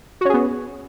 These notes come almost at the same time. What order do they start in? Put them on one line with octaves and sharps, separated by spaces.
F#4 C#4 G#4 B3